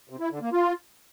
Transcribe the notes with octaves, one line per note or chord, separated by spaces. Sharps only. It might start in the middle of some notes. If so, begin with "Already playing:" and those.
C3
E4
D3
A#3
F4